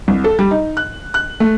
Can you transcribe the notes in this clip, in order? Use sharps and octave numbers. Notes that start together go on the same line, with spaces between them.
C2
A4
G3
D#4
F#6
F#6
A3